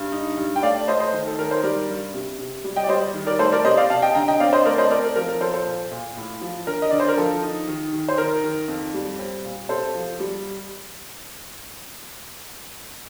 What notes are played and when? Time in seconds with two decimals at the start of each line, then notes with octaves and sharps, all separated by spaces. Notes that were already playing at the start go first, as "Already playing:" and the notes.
Already playing: G2
0.12 D#4
0.37 G2
0.56 G5
0.62 A3 D5 F5
0.87 A3 C5 D#5
1.00 C5 D#5
1.13 D#3
1.27 A4
1.38 D#3 A#4
1.51 C5
1.63 G3 A#4 D5
1.88 G2
2.14 C3
2.39 C3
2.64 G3
2.76 D#5 G5
2.84 D5
2.89 G3 C5 D#5
3.14 D#3
3.27 A#4 D5
3.39 A3 A4 C5
3.52 A#4 D5
3.64 C3 C5 D#5
3.77 D5 F5
3.90 C3 F5 A5
4.02 D#5 G5
4.15 D3 G5 A#5
4.28 D#5 G5
4.40 C4 D5 F5
4.53 C5 D#5
4.65 A3 A#4 D5
4.78 C5 D#5
4.91 C4 A#4 D5
5.04 A#4
5.16 F3 A#4
5.29 A#4
5.41 F3 A4 C5
5.54 A4 C5
5.66 A#2
5.91 A#2
6.17 A2
6.41 F3
6.67 D3 A#4
6.82 D#5
6.90 D3 D5
7.00 C5
7.08 A#4
7.17 F3 A4
7.43 D#4
7.68 D#3
7.93 D#3
8.08 C5
8.18 D#3 A#4
8.44 D#3
8.68 F2
8.94 G3
9.19 C4
9.44 A#2
9.69 C3 A4 C5
9.95 F3
10.20 G3